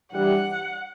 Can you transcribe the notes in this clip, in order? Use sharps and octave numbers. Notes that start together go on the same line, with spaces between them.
G2 E3 G3 F#5